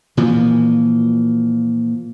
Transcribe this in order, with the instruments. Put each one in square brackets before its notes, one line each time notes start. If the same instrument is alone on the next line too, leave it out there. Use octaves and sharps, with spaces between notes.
[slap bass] A#2 E3 F3